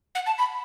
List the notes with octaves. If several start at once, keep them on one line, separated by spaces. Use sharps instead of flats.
F#5
A5
B5